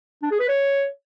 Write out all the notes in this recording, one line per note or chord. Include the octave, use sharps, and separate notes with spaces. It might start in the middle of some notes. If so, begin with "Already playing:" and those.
D4
G#4
B4
C#5